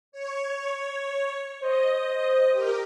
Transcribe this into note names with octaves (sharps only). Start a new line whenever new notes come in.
C#5
C5 D#5
G4 A#4